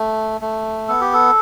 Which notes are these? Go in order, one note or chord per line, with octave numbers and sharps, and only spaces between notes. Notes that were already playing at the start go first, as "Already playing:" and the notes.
Already playing: A3
A3
B3 A4
G4
A4